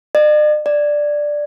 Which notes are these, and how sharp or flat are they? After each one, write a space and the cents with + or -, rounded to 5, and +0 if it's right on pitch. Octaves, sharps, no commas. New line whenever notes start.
D5 +45
D5 +5